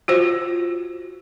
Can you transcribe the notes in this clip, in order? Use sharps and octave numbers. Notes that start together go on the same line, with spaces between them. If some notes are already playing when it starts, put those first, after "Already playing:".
F4 F#4 C5